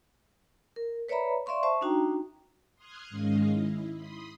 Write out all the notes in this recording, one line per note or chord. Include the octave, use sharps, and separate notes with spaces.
A#4
B4 C#5 D5 E5 A#5 B5
D5 E5 F5 C6 C#6
C5 E5 A5 C#6
D4 D#4 F#4 G5 A#5
C6 D#6 F6 F#6 G#6
G#2 D#3 G#3 C#4 D#5 F5
E4
B5 C6 D#6